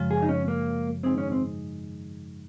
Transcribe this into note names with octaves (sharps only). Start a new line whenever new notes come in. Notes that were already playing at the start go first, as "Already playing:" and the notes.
Already playing: F#2 C#3 F3 G#3
G#4
D#4
C#4
A#3
G#2 D#3 G#3 C4 D#4 G#4
C#4
C4